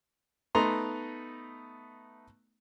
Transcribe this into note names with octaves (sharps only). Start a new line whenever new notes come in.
A3 B3 D#4 A#5 C6